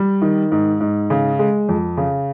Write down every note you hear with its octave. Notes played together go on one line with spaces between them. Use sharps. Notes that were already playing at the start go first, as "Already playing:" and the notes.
Already playing: G3
D#3
G#2
G#2
C#3
G#3
F2
C#3